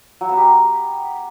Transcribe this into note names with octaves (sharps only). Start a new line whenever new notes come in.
F#3
B3
G4